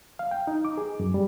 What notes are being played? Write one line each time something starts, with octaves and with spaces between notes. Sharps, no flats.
F5
G5
D#4
D6
G#4
F#2
G3